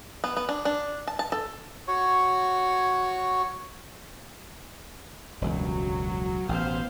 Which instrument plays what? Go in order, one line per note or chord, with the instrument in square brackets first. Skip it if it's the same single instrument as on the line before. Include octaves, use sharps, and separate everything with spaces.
[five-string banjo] B3
B3
D4
D4
A5
A5
A4
[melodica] F#4 C#5 C#6
[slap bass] E1 C#2 G2 [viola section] F#3
[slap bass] A1 B2 [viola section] B3 C5 F5